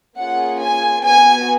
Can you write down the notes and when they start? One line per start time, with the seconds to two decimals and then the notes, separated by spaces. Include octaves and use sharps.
0.18 A#3 C#4 F4 G#4 F#5
0.62 G#5
1.06 B3 F#4 G#5